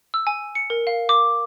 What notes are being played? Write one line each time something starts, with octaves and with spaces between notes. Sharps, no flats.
E6
G#5
C#7
A#4
F5
D6